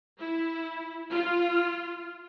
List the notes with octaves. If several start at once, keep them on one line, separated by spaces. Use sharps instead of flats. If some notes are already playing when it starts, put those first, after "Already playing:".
E4
F4